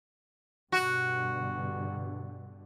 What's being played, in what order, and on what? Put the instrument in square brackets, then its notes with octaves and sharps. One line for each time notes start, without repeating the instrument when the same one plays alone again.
[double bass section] G2 B2 D3 [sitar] F#4